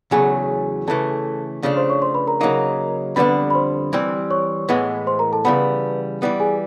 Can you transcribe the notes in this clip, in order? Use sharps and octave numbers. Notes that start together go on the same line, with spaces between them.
E2 C#3 F#3 A3 G#4 G#5
C#3 E3 A3 A4 A5
C#3 F3 A3 D4
C5 C6
C#5 C#6
C5 C6
B4 B5
A#4 A#5
C#3 F#3 A#3 D#4 A#4 A#5
F2 D3 G3 B3 D4 B4 B5
B4 B5
B5
C5 C6
E3 G3 C4
C#5 C#6
A2 E3 G#3 B3
C5 C6
A#4 A#5
A4 A5
C#3 E3 G3 B3 B4 B5
E3 G3 B3
G#4 G#5